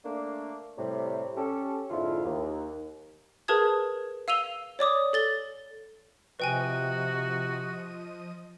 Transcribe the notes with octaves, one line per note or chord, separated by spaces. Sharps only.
A3 A#3 D4
A2 C3 G3
C#4 G4 A4
F2 G#2 D3 E4 F4
D#2
G#4 A#4 B4 A5 D#6 G#6
F5 E6 D#7 F7 G7
C#5 D5 D6 D#6
A4 A6 G7
C3 F3 F#4 B4 D#5 G5 G#5 D#7